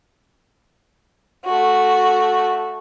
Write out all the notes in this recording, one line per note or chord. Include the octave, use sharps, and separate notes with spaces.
A3 F#4